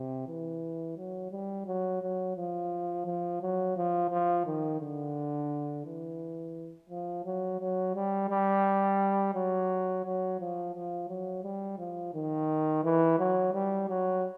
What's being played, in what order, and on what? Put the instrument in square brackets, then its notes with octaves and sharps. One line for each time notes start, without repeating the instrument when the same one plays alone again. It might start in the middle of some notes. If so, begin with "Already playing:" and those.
Already playing: [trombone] C3
E3
F#3
G3
F#3
F#3
F3
F3
F#3
F3
F3
D#3
D3
E3
F3
F#3
F#3
G3
G3
F#3
F#3
F3
F3
F#3
G3
F3
D#3
E3
F#3
G3
F#3